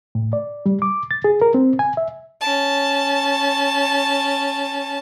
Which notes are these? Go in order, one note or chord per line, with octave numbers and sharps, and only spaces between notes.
A2
D5
G3
D6
A6
G#4
A#4
C4
G#5
E5
C#4 A5